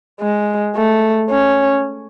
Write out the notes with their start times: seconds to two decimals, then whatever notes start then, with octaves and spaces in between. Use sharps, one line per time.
0.21 G#3
0.75 A3
1.30 C#4